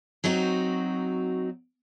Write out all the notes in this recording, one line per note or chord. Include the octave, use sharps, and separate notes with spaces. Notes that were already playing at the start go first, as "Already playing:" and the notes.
F#3 C4 D#4 F#4